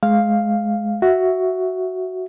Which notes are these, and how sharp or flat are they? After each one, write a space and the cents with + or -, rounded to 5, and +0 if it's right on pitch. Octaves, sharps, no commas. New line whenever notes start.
G#3 +20 F5 +0
F#4 +5 E5 +0